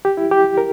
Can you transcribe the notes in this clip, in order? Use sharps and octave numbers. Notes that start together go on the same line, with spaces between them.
G4
E4
G4
A#4